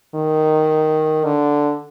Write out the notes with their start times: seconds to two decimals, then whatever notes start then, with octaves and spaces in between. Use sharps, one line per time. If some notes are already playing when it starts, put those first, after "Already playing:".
0.15 D#3
1.25 D3